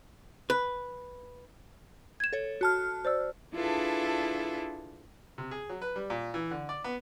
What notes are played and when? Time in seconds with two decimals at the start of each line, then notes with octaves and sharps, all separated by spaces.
0.50 B4
2.20 G#6 E7
2.33 A4 C#5
2.61 F#4 A5 F6
3.05 C5 D5 E6
3.55 D4 E4 F4 G#4 A4 B4
5.38 C3
5.51 G#4
5.69 F#3
5.82 B4
5.96 G3
6.10 A#2
6.34 E3
6.51 D3
6.69 D5
6.84 B3